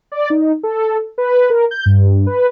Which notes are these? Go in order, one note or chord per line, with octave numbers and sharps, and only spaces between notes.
D5
D#4
A4
B4
A#4
G6
G2
B4